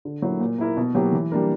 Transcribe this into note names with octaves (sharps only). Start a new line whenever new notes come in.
D3
F#3 A#3 E4
A#2
A#3 E4 A#4
B2
F#3 A#3 E4 G4
E3
G3 A#3 D4 A#4